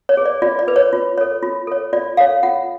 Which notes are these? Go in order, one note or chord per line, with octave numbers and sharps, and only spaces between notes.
C#5
G#4 B4
D5
F4 D5
D5
G#4 B4
C#5
F4
A4 C#5
F4
A4 C#5
F4 D5
A4 C#5 F5
F4 F#5